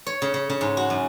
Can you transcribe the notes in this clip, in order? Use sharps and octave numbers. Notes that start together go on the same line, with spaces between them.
C#5
C#3
C#3
C#3
G#2
F#4
F#2